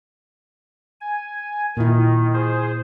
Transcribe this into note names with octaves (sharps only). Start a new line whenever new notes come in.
G#5
A#2 D#3 E4
G#4 C5